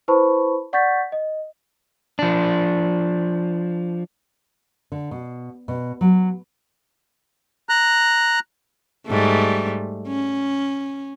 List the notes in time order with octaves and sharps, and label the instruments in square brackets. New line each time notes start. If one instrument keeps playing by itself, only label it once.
[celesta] E4 B4 C5 A5 B5 C#6
D5 F#5 C#6 G6 A6 B6
D#5
[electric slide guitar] F3 D4
[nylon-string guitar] D3
B2
B2
F#3
[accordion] A#5 F#6
[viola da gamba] G#2 G3 A3
C#4